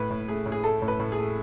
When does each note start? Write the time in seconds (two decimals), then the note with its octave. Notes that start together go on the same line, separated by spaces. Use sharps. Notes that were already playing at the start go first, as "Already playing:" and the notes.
Already playing: A2 B4
0.10 A2
0.28 A3 G#4
0.46 A2
0.52 G#4
0.64 A3 A4
0.82 A2
0.88 B4
1.00 A2
1.12 G#4
1.18 A3